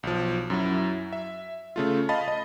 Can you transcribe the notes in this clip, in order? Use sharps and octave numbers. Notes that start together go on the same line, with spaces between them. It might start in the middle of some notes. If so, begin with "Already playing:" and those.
B1 F3
F#2 F#3 E4
E5
C#3 A3 F4
D#5 F5 A5 B5 A6
D#5